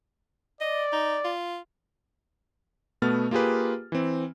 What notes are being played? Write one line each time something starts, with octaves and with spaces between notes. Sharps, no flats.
D5 D#5
D#4
F4
B2 A3 B3 F6 A6
A#3 F4 G4 G#4 B4
E3 C4